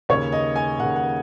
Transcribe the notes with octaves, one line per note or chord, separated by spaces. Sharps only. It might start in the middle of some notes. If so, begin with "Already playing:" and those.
D#2 C#3 C#5
D#5
G#5
D#2 C#3 F#5
F#5